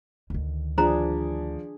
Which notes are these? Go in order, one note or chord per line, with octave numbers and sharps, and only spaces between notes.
D2 D#3
F3 D4 G#4 C5 A#5